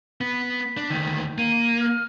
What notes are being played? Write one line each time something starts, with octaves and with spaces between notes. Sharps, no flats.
B3 B6
D4
D2 D#3
A#3 D#7
F6